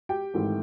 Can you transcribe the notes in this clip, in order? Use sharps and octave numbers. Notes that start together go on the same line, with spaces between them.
G4 G5
G#1 G#2 E3 A3